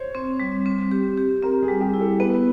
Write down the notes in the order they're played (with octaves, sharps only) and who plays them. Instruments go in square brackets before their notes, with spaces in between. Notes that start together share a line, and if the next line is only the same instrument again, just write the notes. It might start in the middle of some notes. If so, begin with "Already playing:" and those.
Already playing: [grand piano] C5 C#5
[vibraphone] C4
G3
C4
G4
G4
[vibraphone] C4 [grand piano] A#4
[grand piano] G#4
[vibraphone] G3
[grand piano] G4
[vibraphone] E4
[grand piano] A4
[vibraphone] B3 [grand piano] B4